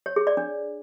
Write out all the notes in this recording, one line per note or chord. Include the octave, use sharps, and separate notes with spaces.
C#5
G#4
D5
D4